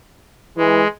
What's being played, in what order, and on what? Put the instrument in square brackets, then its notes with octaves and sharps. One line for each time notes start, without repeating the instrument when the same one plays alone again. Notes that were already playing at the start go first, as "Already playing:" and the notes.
[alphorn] E3 [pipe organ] G#3